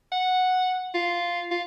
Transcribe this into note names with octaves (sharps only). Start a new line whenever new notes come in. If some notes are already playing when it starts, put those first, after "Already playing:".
F#5
F4
F4